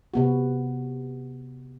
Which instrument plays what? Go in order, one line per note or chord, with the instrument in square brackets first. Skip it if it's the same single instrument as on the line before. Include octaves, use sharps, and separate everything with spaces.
[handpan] C3 B3 F#4